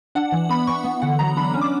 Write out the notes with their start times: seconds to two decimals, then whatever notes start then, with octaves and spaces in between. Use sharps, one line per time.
0.15 D4 F#5
0.32 E3
0.49 B3 B5
0.67 E3 C#6
0.84 B3
1.02 D3 F#5
1.19 F#3 A#5
1.37 D4 B5
1.54 C#4
1.61 D6